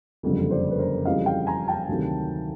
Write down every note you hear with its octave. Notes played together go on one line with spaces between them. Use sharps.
F#1 F2 D3 G3
C5 D5
B4
A#4 C5
F2 C#3 E3 G3 D#5 F5
F5 G5
G#5 A#5
G5 A5
D2 C3 D#3 F#3